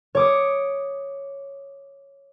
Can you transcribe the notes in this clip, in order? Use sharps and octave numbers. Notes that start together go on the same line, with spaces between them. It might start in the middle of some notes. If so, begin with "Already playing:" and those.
C#5 D6 D#6